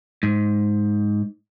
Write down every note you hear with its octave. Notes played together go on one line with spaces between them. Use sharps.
G#2